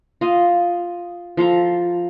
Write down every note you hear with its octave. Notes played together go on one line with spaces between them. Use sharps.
F4 D#5
F3 F4 A4 A#5